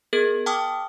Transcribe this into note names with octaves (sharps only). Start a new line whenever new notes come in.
B3 G#4 A#4 G#6
G5 A5 D6 D#6 F6